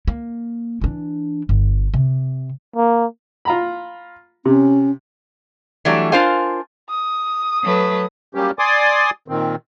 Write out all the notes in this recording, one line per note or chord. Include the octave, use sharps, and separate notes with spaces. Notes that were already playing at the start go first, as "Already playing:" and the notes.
A#3
E3 D4
G1
C3
A#3
F4 A#5 B5
C3 C#4
E3 F#3 G3 A3 D4
D4 F4 A#4 C5 F5 G#5
D#6
F#3 A3 B4
F#3 G3 A#3 C#4 G4
D5 G#5 C6 D6 D#6
A#2 D#3 C4